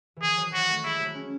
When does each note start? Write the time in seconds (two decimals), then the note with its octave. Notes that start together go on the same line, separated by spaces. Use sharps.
0.16 E3
0.22 D#3 G#4
0.37 F#3
0.53 F#3 F#4
0.69 A3
0.84 G#3 E4
1.00 F#3
1.15 C#4